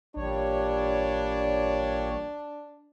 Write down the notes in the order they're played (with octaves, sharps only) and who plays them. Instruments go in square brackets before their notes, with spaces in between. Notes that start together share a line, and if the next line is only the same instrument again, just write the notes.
[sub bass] A1 [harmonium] A#2 G3 C#5 [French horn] D4